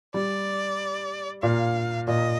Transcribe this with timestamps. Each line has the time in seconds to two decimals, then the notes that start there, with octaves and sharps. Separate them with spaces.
0.14 G3 D5
1.43 A#2 F5
2.08 A#2 D#5